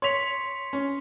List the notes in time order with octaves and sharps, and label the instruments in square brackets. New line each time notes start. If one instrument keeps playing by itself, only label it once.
[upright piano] C#5 F7 [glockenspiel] C6 B6 C#7
[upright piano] C#4